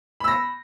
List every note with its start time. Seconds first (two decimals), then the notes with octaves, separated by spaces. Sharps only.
0.20 B5
0.24 E6
0.28 A#6